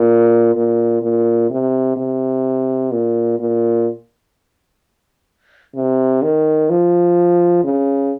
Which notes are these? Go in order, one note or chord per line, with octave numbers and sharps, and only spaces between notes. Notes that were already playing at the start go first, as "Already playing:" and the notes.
Already playing: A#2
A#2
A#2
C3
C3
A#2
A#2
C3
D#3
F3
C#3